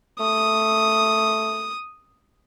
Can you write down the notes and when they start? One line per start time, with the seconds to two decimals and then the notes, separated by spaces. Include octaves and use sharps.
0.20 A3 D#6